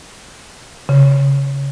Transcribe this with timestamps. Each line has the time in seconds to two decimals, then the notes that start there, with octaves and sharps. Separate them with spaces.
0.89 C#3